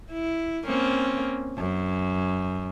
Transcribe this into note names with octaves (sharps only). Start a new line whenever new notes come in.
E4
A#3 C4 C#4
F#2